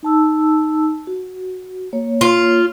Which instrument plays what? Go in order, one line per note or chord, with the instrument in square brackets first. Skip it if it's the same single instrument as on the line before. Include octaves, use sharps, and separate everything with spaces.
[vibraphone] D#4 A5 E6
F#4
A#3 C#5
[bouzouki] F4